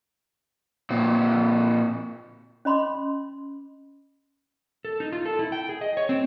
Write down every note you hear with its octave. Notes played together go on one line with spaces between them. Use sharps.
A#2 C4
C#4 D#5 B5 C6 D6
A4
D#4
F4
A4
E4
G5
G#4
D#5
C#5
C4